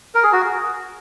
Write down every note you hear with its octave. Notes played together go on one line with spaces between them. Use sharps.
A#4
G#4
F#4